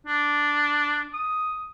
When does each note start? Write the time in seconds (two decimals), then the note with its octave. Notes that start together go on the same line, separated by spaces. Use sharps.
0.07 D4
1.14 D#6